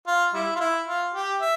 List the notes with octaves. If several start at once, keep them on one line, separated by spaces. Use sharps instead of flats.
F4
G3 E4
F4
E4
F4
G4
E5